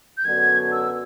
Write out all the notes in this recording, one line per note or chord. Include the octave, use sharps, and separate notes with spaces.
G6
F#2 D3 F#3 B3 D4 G#6
E6